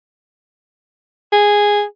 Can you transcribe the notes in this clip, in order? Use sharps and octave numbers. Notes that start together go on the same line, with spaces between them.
G#4